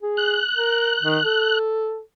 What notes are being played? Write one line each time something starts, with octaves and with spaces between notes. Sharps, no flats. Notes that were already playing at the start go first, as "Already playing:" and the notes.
G#4
F#6
A#4
D#3
A4